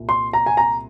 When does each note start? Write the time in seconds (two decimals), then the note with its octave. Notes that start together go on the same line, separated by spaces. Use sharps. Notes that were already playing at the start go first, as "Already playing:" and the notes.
Already playing: C2 A#2
0.09 C6
0.33 A#5
0.46 G#5
0.57 A#5